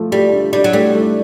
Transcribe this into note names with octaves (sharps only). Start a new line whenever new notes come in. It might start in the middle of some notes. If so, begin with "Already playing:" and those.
Already playing: F3 A3
G3 A3
D4
G3 D4
F#3
G3 A3
A3